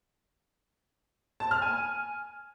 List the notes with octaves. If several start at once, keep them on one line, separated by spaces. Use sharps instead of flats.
A5
F6
G#5